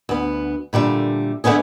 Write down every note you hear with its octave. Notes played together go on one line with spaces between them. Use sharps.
D2 B3
A#2 D3 G3 A3
D3 A3 B3 C#4 G#4